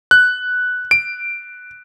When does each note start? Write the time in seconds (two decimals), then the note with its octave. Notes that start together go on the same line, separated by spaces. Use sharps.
0.11 F#6
0.91 D7